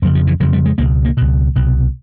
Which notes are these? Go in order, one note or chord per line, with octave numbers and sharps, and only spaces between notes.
F2 C#3 F#3
F3
E3
F2 C#3 F#3
G3
G#3
C#2 B2 A#3
A#3
C#2 B2
C2 B2